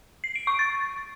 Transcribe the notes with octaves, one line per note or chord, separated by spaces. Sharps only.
C7
D7
C#6
A6